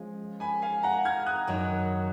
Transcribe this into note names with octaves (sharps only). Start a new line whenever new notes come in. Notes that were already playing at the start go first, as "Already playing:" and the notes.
Already playing: F3 G#3 C#4
G#5 B5
F5 G#5
F#5 A#5
F6 G#6
D#6 F#6
F#2 D#3 F#3